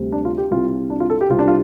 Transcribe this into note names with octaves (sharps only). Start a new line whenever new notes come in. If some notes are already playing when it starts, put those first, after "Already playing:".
Already playing: D2 C3 G3 C4
D4
F4
G4
C2 C3 G3 F4
D4
F4
A4
G4
C2 C3 G3 F4
D4
F4